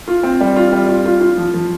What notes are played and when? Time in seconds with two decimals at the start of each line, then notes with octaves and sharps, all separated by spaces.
0.08 F4
0.23 C4
0.41 G3
0.56 F4
0.73 G3
0.88 F4
1.06 F4
1.21 F4
1.38 F3
1.54 F3